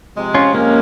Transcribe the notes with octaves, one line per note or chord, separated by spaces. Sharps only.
C3 F3 G#3
C#4 F4
A#3 C#4